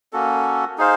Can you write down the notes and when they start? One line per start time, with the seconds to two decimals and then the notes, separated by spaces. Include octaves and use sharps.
0.13 A#3 C#4 F#4 A4
0.78 D#4 G#4 C5 F5